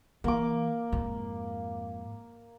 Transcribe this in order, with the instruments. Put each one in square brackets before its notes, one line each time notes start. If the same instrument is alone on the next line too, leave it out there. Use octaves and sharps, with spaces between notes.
[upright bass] E3 [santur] A#3 D6
[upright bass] F2 G#2